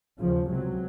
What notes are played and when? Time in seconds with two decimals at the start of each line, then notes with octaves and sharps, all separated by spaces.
0.19 D#2 C#3 F3
0.48 C#2 C3 F#3